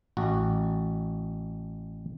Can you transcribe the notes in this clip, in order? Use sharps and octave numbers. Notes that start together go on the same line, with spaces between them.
A1 F#4